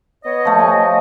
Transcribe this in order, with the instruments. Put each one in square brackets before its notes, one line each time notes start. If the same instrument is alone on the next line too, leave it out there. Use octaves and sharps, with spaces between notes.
[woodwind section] B3 C#5 D#5
[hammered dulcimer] F3 A3
G#5